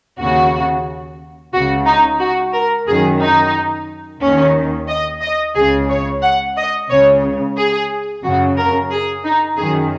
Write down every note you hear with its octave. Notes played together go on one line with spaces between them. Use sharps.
D#2 C#3 F#4
C#2 C#3 F#4
D#4
F#4
A#4
F#2 D#3 G#4
D#4
D#2 D#3 C#4
D#5
D#5
C#2 C#3 G#4
C#5
F#5
D#5
C#2 C#3 C#5
G#4
F#2 C#3 F#4
A#4
G#4
D#4
F#2 D#3 G#4